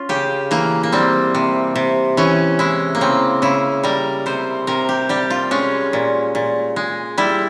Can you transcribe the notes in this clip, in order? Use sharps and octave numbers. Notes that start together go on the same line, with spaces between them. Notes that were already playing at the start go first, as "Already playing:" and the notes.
Already playing: C#4 F4
C#3 G4
E3 A#3
A#3
G3 C4
C3
C3
E3 C#4
G#3 E4
A#3
C#3 C4
C#3 E4
G3 A#4
C3 C5
C3 A#4
G4
G3 G4
F4
G#3 C#4
A#2
A#2
G#3
G3 E4